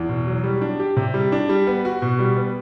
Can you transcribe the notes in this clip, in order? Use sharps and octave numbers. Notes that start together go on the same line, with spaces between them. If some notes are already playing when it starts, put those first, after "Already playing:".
Already playing: E2
B2
F#3
G3
D4
G4
C3
G3
D4
G3
B3
F#4
B2
G3
B3